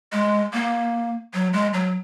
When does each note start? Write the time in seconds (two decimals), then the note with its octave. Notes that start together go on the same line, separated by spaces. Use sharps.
0.13 G#3
0.53 A#3
1.34 F#3
1.53 G#3
1.73 F#3